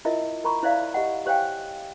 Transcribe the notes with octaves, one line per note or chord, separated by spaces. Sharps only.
E4 F4 A#4 D#5 E5
A#4 A#5 B5 C#6
E4 C5 D5 E5 F5
G4 D#5 F#5
G4 C5 C#5 F5 G5 G#5